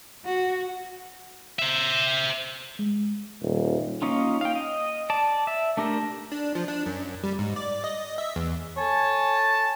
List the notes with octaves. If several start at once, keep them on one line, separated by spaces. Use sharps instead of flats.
F#4
C5 E5
G#3
D#1
A#3 C#4 D#4 F4
F5 G5
D#5
D5 A5
E5
A3 D4 G4 A#4
D4
F3
D4
F#2
G3
G#2
D5
D#5
E5
E2
A4 C#5 G#5 A5